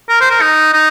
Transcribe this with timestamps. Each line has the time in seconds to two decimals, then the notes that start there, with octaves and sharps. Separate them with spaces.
0.09 A#4
0.21 C5
0.30 A#4
0.41 D#4
0.73 D#4